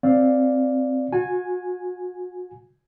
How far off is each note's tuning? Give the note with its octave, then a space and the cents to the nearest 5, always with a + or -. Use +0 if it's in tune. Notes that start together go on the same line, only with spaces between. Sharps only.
C4 +0 D5 +0 F5 +0
F#4 -40 G#5 +0